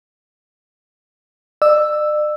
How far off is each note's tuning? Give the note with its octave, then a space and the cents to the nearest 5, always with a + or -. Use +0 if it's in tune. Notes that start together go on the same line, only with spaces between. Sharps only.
D5 +45 E6 +0